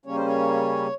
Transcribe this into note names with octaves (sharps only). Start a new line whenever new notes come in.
C#3 G3 A#3 C#4 C#5
C5
C#5